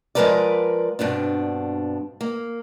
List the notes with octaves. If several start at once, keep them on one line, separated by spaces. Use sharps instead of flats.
F3 G#3 A#3 A#4 B4 D5
G2 B2 C4 D4
A#3